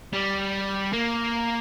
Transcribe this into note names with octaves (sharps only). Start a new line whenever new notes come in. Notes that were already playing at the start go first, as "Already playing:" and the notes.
G3
A#3